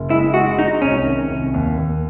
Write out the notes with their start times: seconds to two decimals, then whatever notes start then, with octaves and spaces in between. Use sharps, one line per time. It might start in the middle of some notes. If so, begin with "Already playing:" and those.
Already playing: F#1
0.10 G#3 E4
0.34 G#3 F#4
0.58 G#3 D#4
0.82 C2 C#4
1.06 D#3
1.30 C2
1.54 D#2
1.78 D#2